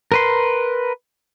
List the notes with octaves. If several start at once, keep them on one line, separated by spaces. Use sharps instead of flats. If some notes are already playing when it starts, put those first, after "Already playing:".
A#4 B4 C6